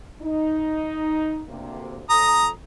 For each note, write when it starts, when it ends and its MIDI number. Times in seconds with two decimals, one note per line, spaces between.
0.22 1.43 63
1.48 2.02 38
1.48 2.02 48
1.48 2.02 58
2.10 2.51 41
2.10 2.51 69
2.10 2.47 82
2.10 2.47 87